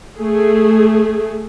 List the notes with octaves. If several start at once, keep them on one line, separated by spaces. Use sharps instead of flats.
A3 G#4